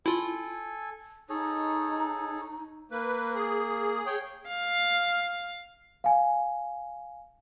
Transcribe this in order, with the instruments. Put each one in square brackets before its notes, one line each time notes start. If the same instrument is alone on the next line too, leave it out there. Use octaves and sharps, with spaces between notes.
[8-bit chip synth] E4 F4 [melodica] A4 G#5
[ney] D#4 [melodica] G#4 A4 C#5
[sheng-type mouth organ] A#3 [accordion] B4
[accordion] G#4
[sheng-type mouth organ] C#5 G5
[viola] F5
[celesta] F5 G#5